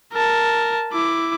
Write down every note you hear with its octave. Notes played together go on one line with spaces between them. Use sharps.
A#4 A5
E4 D6